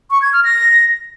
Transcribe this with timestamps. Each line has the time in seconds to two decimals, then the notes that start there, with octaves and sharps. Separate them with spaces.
0.10 C#6
0.22 G#6
0.33 F6
0.44 A#6